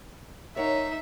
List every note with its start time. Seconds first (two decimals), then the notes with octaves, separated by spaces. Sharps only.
0.56 D#4 A#4 C#5 E5 F#5